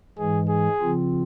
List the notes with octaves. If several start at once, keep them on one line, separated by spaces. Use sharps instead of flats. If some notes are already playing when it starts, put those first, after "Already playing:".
G#2 E3 G#3 G#4
G#4
C#3 F3 C4 F4